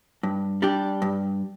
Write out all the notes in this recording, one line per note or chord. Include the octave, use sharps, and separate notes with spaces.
G2
G3 D4 G4
G2